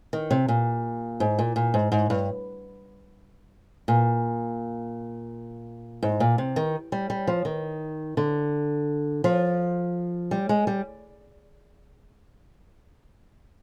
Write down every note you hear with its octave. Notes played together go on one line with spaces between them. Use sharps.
D#3
C3
A#2
G#2
A#2
A#2
G#2
G#2
G2
A#2
G#2
A#2
C3
D#3
G3
G3
F3
D#3
D3
F3
G3
G#3
G3